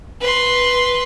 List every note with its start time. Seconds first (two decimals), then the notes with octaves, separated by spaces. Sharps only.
0.21 B4 C6